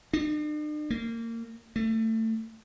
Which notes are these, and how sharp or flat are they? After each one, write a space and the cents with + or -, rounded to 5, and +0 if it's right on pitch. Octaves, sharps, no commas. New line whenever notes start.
D4 +45
A#3 -25
A3 +25